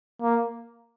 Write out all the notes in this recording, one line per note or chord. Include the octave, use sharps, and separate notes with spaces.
A#3